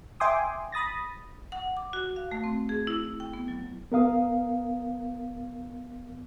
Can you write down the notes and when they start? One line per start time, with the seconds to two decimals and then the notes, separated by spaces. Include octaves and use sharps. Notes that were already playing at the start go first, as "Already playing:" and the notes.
0.20 E5 G5 G#5 C6 D6 D#6
0.72 B5 D#6 A6 A#6
1.52 F#5
1.77 D6
1.93 F#4
2.16 F5
2.31 A3
2.44 C4
2.69 G#4
2.87 E4
3.20 G5
3.34 B3
3.48 F#3
3.92 B3 A#4 F5 D#6